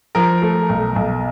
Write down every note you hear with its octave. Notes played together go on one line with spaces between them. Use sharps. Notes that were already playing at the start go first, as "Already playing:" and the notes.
F3 A#4
A3
B1
B1